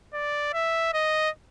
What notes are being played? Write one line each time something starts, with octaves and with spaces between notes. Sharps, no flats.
D5
E5
D#5